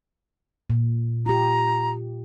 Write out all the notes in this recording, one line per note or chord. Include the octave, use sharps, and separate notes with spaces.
A#2
F4 G4 A#5